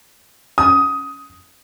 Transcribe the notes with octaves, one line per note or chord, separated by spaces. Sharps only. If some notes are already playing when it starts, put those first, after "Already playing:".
D#6